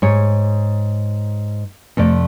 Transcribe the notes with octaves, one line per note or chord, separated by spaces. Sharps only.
G#2 C#5
F2 C3 A3 D5